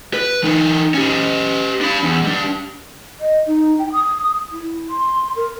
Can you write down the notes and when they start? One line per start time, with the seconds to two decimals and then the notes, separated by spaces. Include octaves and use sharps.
0.14 B4
0.43 E3 D#4
0.94 C#4 G4
1.81 D4 B5
2.03 E2
2.24 G3 D4
3.20 D#5
3.47 D#4
3.79 G5
3.93 D#6
4.52 E4
4.90 C6
5.36 A#4